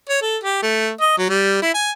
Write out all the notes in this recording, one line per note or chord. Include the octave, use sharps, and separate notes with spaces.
C#5
A4
G4
A3
D#5
F#3
G3
E4
G#5